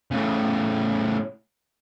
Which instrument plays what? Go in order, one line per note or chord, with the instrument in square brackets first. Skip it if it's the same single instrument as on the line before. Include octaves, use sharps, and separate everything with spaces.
[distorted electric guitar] A2 C#3